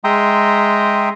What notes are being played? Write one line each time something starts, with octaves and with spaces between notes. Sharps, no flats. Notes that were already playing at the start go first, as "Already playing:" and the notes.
G#3 E5 G5 A#5 C6 D#6